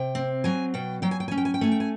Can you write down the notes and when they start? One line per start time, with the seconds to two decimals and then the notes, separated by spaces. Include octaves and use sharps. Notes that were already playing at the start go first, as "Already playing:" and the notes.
Already playing: C3 G5
0.15 C4
0.44 F#3 G#5
0.74 B2 G5
1.02 F#3 G5
1.11 G#5
1.20 G5
1.28 C#4 G#5
1.38 G5
1.45 G#5
1.54 G5
1.61 A3 G#5
1.72 G5
1.80 G#5